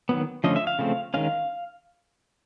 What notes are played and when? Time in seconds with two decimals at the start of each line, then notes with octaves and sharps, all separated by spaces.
0.09 D#3 F#3 B3
0.44 D3 F3 A3 C#4 D#5
0.56 E5
0.67 F5
0.79 C#3 F3 A3 C4
1.14 D#3 G#3 C#4 F5